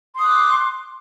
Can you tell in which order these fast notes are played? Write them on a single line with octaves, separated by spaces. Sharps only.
C6 D#6 F#6 D6